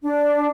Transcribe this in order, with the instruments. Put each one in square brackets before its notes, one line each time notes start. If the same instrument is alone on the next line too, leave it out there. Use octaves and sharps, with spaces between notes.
[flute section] D4